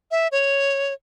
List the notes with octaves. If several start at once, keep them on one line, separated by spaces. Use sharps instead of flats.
E5
C#5